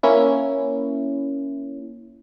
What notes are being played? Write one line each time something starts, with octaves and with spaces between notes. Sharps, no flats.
A#3 C#4 E4